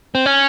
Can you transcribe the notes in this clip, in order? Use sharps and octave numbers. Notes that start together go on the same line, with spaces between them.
C4
C#4